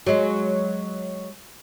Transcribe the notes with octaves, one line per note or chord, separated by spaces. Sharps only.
F#3 G#3